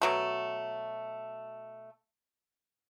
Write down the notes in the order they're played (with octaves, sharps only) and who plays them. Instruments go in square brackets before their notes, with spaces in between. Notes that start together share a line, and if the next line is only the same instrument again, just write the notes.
[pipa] B2 F#3 A3